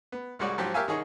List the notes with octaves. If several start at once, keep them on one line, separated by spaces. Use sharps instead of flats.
B3
C2 G3 G#3 F#4 C#5 D5
G#2 F3 F#3 G4
G4 A#4 C#5 E5 F5 G#5
C2 D#3 D#4 G#4 C#5